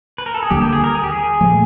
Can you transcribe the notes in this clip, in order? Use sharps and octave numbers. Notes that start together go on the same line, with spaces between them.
B4
A#4
A4
G#4
D#2 D3 G3 A#3 G4
G4
G#4
A#4
G#4
G4
G#4
A#2 F3 A3